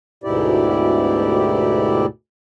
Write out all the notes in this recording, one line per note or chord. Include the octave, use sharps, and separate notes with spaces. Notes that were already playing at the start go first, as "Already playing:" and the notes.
D2 G#2 B2 E4 G4 D5